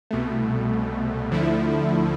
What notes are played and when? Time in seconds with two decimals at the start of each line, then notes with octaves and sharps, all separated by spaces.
0.11 C2 B2 A3
1.31 D2 D3 F3 A3 E4